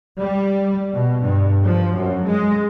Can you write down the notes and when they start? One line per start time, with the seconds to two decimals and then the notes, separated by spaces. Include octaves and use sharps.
0.19 G3
0.93 B2
1.23 G2
1.64 F3
1.95 F#2
2.26 G#3